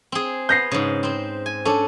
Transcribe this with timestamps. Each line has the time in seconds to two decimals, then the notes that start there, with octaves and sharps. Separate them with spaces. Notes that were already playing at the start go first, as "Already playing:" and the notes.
0.12 C4 G#4
0.49 B3 G6 A#6 C7
0.71 G#2 C#3
1.03 C4 C5
1.46 G#5
1.65 C#4 D4 A4